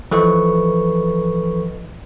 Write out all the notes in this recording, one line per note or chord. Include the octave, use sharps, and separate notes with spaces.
E3 F3 A4 B4 D#5 C#6